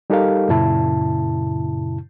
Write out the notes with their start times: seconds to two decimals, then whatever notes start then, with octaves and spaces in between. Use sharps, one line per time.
0.10 G3 D#4 G4 A4 A#4 F5
0.49 F#2 A#2 C#3 E4 A5